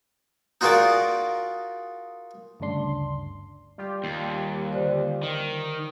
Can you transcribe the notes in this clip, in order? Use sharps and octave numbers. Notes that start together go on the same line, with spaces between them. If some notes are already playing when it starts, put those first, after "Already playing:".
D#4 F4 F#4 G#4 A#4 D5
G1 D2 G2 C#3 D4 C6
G3 F4 G4
D#2
D3 C5 D5
D#3